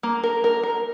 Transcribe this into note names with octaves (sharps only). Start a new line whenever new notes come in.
A#3
A#4
A#4
A#4